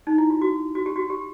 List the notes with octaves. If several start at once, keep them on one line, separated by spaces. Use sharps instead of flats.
D#4
E4
F4
F#4
F#4
G4
F#4
G4